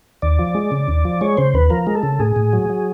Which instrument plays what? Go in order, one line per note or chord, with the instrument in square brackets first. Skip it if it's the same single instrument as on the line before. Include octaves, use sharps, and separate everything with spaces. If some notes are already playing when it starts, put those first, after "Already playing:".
[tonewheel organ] D#2 D5
F3
G#3
C#3
D#2
F3
G#3 C#5
C#3 C5
D#2 B4
F3 A#4
G#3
A4
C#3
A2 G#4
A2
F#3
F#3